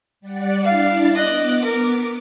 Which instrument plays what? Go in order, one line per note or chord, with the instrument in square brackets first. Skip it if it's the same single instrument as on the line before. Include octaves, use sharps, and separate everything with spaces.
[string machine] G3 D5 F#5
[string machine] D4 E4 A6 [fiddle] F5
[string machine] B3 D6 [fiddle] D#5 F#6
[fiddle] A#4